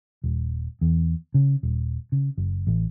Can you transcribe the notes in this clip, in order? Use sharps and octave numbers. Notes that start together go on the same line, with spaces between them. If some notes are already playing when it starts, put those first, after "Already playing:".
D#1
E2
C#3
D#1
C#3
F#1
A1